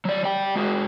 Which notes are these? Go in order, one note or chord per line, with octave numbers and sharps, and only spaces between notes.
F#3 D5
D5 G5
G#3 F#4